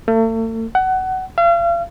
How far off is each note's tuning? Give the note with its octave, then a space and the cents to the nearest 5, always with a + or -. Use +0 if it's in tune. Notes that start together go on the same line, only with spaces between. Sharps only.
A3 +40
F#5 +20
F5 -40